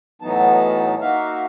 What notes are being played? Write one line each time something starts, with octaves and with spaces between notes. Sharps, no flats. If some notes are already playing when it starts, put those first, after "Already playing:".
A2 E3 F#3 B3 D#4 A5
A#3 D#4 F#4 E5 F5